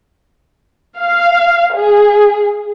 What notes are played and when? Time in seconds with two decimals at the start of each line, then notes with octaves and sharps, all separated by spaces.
0.98 F5
1.74 G#4